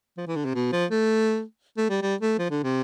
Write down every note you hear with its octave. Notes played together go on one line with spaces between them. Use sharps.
F3
E3
D3
C3
B2
F3
A3
A3
G3
G3
A3
F3
D3
C3